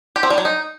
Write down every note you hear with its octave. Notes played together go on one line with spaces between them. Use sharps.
G4
C4
G3
F#3
D#4